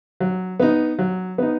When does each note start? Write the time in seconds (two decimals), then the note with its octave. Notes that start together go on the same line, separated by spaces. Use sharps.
0.20 F#3
0.60 B3 D#4
0.99 F#3
1.38 B3 D#4